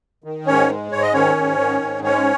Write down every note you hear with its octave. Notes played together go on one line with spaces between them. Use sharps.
D#3
G#2 C#4 C#5
G#3
G#2 C#5
D#5
D#3 C#4 C#5
G#2
D#3
G#2
G#3 C#4 C#5